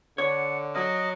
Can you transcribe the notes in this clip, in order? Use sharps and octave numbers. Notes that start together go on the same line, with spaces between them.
D3 C#5 F#5
F#3 D#5